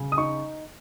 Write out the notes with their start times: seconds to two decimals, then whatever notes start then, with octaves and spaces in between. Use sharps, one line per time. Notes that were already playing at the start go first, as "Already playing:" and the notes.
Already playing: C#3
0.12 D#6
0.17 D#4 C#6